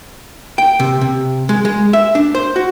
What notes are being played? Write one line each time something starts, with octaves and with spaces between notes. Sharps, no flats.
G5
C3
C3
G#3
G#3
E5
D4
C5
F#4